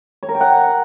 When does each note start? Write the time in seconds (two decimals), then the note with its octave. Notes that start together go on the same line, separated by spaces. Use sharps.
0.23 C#5
0.29 A#4
0.35 G5
0.41 F#5